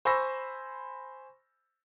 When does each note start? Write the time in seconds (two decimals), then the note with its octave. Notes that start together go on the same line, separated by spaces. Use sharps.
0.05 C5 G#5 B5 C#6 E6 A#6